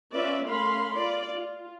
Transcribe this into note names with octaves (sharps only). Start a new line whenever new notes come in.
C#4 F4 B4 D5 E5
A3 C#4 A#4 F5 B5 C6
F4 D5
F4